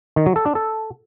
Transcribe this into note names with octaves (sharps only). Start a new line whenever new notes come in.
D#3
F#3
A4
D4
A4